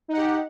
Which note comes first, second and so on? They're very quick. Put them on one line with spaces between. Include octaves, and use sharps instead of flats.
D#4 F#5 G4